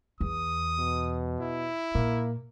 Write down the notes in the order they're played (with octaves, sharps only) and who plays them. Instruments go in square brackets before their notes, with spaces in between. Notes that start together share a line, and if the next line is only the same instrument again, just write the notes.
[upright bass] E2 [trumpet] D#6
[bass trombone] B2
[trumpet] E4
[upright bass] A#2 [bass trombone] A#3